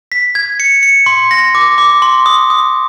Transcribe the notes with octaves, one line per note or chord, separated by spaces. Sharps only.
B6
G#6
C#7
C#7
C6
A#6
D6
D6
C6
D#6
D#6